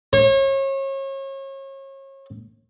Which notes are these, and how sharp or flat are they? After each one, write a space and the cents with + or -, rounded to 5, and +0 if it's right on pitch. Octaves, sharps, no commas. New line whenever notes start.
C#5 -35